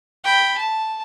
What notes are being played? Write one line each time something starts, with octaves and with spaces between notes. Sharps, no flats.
G5 B5
A5